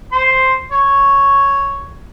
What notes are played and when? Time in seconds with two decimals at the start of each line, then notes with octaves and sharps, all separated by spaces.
0.12 C5 C6
0.72 C#5